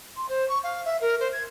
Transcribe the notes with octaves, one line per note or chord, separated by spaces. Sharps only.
C6
C5
C#6
F5
E5
A#4
C5
G#6